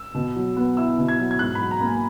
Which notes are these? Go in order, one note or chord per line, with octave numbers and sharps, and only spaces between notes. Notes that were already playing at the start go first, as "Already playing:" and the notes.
Already playing: E6
B2
F#3
B3
E4 E6
B2
G#6
F#3
G#6
G#2 F#6
B5
F#3
A#5
A#3
G#5